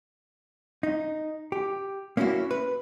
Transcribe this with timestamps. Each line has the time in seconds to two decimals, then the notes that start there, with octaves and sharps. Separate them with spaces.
0.83 D#4
1.52 G4
2.17 A#3 C#4 D#4 E4 F#4
2.51 B4